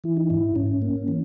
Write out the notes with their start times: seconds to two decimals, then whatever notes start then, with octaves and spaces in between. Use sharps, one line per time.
0.04 E3 E4
0.17 D#4
0.30 G#2 E4
0.56 G#2 C#4
0.82 A#3
1.08 E3